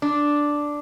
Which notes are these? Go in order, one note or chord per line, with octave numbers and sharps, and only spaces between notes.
D4